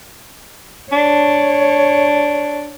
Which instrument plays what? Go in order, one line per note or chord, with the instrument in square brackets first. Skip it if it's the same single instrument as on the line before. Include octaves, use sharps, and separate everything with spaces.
[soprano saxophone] D4 [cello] C#5